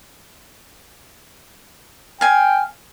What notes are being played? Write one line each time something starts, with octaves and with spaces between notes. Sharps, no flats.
F5 G5 G#5